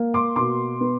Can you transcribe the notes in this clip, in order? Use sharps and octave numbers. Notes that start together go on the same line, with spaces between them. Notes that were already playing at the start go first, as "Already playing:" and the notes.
Already playing: A#3
C6 D6
B2 C6 D6
B3